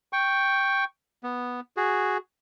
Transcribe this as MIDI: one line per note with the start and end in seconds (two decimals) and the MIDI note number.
0.13 0.84 79
0.13 0.84 85
1.23 1.60 59
1.77 2.17 66
1.77 2.17 68